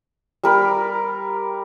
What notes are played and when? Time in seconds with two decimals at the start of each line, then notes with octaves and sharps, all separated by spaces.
0.44 G3 A#4 B5